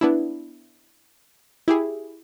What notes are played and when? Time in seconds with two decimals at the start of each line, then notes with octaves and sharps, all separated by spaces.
0.01 B3 D4 E4
1.68 E4 G4 G#4